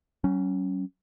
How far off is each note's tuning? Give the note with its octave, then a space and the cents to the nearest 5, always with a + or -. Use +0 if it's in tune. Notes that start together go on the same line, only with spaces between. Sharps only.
F#3 +45 C#4 +0